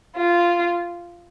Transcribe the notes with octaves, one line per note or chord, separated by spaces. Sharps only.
F4